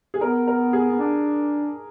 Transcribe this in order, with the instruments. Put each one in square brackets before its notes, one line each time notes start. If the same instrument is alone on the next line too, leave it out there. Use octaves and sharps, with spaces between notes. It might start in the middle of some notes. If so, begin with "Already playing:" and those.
[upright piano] G#4
[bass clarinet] B3 [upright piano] A#4
[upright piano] A#4
G#4
[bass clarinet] B3
D4